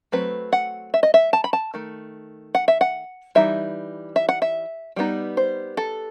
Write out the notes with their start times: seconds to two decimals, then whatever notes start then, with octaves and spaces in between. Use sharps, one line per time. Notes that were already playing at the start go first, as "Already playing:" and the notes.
0.12 F#3 A3 C4 B4
0.53 F#5
0.94 E5
1.03 D#5
1.14 E5
1.33 A5
1.44 B5
1.53 A5
1.74 D#3 A3
2.55 F#5
2.68 E5
2.81 F#5
3.35 E3 G3 D#4 E5
4.16 E5
4.29 F#5
4.42 E5
4.96 G3 B3 D#4
5.37 C5
5.77 A4